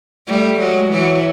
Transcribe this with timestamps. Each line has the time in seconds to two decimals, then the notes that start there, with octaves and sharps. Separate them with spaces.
0.27 G3 A3
0.60 F#3 G#3
0.91 E3 F#3